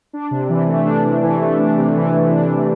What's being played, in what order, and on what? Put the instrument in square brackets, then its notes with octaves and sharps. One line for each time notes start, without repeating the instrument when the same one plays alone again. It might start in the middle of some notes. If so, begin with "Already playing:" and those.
[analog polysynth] D4
C3
E3
A3
D4
C3
E3
A3
D4
C3
E3
A3
D4
C3